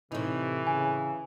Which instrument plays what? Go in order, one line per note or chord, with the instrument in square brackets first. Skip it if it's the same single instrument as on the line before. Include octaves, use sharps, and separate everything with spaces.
[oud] A2 D#4 [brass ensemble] C3 [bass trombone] E3
[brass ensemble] C#3 [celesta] G#5